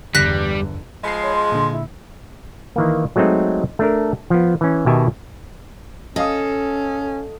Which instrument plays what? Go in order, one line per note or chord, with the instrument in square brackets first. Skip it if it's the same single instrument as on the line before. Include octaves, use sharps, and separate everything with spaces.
[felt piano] G1 [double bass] E2 [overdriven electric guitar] G3 [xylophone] F#6 A#6 B6
[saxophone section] F3 G#3 [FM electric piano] B5 C7
[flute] C#5
C6
[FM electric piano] A#2 D3
[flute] E4
[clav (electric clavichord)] D#3 E3 A#3
F#3 G#3 A3 C4 D#4
A3 D4 A#4
F3 B3
E3 C#4
B2 D#3 G4 E5 G#5 A5
[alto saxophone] C#4 [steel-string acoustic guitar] A4 [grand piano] D#5 F5 D#6